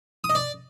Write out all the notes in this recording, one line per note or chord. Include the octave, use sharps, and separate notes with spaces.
D#6
D#5
D5